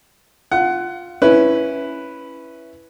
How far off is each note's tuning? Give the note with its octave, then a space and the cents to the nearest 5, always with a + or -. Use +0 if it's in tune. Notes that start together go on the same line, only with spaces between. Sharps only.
F4 +0 F#5 +20
C#4 +0 E4 +0 B4 +0